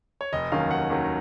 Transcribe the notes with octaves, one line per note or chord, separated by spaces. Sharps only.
C#5
F1 D#5
D#2 D#3 F#3 C#4 F5
F1 F#5
D#2 D#3 F#3 C#4